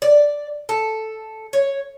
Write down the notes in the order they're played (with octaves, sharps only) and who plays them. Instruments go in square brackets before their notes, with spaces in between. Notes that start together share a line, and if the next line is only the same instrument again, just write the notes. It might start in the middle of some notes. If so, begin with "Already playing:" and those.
[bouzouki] D5
A4
C#5